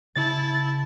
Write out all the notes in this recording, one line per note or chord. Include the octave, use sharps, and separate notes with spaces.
C#3 E4 A5 A6